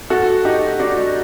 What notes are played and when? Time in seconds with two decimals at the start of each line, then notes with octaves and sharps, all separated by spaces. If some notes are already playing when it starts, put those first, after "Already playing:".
0.10 F#4 A4
0.45 D#4 G4
0.79 D4 F#4
0.97 G3